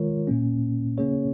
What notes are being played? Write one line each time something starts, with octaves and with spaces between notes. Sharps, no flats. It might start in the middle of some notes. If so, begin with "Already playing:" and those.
Already playing: D#3 G#3 F4 A#4 C#5
A#2 A#3 C#4
C#3 A#3 C#4 G#4 C#5